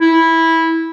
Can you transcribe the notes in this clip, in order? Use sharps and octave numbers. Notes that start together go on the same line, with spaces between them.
E4